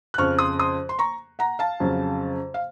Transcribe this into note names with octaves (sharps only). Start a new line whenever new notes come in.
F#6
F2 C#3 F3 C#6 F6
C6 D#6
C6 D#6
C6
A#5 C#6
F#5 A#5
F5 A5
F2 C#3 F#3
F5